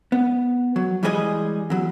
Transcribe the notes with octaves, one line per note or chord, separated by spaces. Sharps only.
B3
F#3
E3 G3 G#3 G#4 C5 D#5
E2 F#3